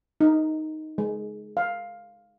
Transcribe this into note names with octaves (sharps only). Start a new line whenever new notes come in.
D#4
G#3
F5